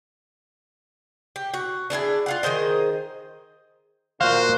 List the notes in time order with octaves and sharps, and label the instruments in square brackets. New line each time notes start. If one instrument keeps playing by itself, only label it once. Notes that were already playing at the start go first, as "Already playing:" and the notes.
[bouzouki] G4
F#4
D4 E4 F4 G#4
F4 F5 F#5
D#3 G#4 C5 D#5
[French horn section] A#2 [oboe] F#4 [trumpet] C5 [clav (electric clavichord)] F5